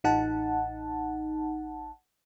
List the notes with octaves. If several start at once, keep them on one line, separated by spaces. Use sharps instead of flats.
A1 D#4 F#5 A5